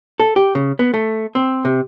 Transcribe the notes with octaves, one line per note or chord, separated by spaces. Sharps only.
A4
G4
C#3
B3
A3
C4
C3